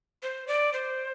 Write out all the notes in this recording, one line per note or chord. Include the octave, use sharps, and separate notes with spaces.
C5
D5
C5